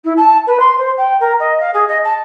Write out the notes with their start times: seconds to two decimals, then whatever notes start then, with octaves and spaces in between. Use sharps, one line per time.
0.04 E4
0.16 A5
0.47 B4
0.59 C6
0.78 C5
0.97 G5
1.20 A#4
1.39 D#5
1.60 F5
1.73 G#4
1.88 D#5
2.04 A5